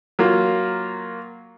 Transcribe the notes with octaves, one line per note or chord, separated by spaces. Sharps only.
F#3 A#3 F4